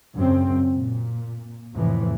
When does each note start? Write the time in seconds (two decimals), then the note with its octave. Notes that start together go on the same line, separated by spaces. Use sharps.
0.14 F#2 C#3 C4
0.73 A#2
1.74 F2 A2 C3 E3